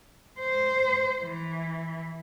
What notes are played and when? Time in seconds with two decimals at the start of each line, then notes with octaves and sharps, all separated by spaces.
0.39 C5
1.21 E3